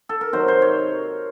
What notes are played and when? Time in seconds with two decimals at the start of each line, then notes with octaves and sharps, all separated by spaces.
0.09 A4
0.21 A#4
0.32 C3 D#3 F#3 C5
0.48 C5
0.62 C#5